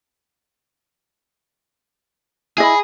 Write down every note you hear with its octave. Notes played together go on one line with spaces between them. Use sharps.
E4 G#4 D#5 B5